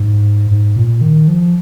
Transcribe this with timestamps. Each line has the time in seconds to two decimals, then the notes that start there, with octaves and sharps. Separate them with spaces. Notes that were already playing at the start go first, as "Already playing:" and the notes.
Already playing: G#2
0.51 G#2
0.76 A#2
1.01 D#3
1.28 F3